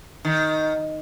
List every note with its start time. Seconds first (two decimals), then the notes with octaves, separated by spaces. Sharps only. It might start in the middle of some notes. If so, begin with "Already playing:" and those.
0.25 D#3